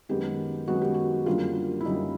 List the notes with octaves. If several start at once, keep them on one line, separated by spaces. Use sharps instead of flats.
F#2 D#3 G#3 B3 G4
F#2 D#3 G#3 B3 F#4
G4
F#4
F#2 D3 G3 A#3 F4
E4
F#2 D3 G3 A#3 D#4